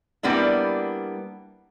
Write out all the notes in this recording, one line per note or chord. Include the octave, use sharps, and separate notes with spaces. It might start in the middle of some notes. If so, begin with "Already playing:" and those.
G3 A#3 B3 D4 E4